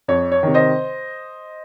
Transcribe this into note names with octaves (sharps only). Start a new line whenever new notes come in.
F2 C#5
C#5
C3 D#3
C5 D#5